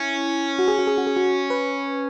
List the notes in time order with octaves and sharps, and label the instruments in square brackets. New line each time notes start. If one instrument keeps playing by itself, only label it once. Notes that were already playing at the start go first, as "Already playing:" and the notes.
Already playing: [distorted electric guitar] C#4 [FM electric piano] E4
[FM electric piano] F#4
G#4
F#4
G#4
F#4
G#4
F#4
B4